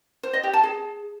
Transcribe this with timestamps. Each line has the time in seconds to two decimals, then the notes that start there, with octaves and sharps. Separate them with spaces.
0.23 C5
0.33 D#5
0.43 G4
0.53 A5
0.64 G#4